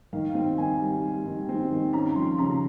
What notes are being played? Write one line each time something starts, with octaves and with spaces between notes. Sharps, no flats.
D#3 F5
C4
D#3 G#5
G3
G3
D#3
C4
D#3
C#4 A#5
F3 C6
C#3 A#5